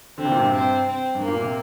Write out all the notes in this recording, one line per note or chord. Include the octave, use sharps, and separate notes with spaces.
D3 C4
C3
A#2
G2 C3
C4
C4
G2
A#3
A#2
C3